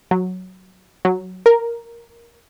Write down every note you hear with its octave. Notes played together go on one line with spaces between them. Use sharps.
F#3
F#3
A#4